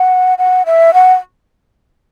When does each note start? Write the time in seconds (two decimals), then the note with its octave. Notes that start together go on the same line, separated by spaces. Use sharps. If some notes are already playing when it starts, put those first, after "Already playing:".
Already playing: F#5
0.38 F#5
0.66 E5
0.94 F#5